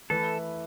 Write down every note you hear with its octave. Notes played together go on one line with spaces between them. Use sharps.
E3 A3 E4 A4 B4